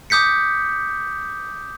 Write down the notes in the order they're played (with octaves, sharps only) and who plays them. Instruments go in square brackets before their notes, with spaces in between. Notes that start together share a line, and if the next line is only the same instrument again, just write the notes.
[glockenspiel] D6 D#6 G6 B6 C#7